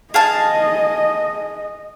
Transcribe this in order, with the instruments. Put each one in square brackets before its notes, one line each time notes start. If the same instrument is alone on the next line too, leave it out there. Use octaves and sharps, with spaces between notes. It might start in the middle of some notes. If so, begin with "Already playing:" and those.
[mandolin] G#4 F5 A5 [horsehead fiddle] D#5